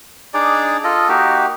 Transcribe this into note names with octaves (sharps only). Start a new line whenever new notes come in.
D4 D#4 G#4 D5
F4 A4 D#5
A#3 D#4 F#4 G4